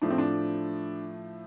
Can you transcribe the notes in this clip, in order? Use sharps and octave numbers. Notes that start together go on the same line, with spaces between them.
A2 F3 A3 D4
C4
D4